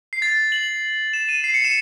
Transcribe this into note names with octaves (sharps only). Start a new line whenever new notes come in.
C7
A6
F#7
E7
D#7
C7
C#7
E7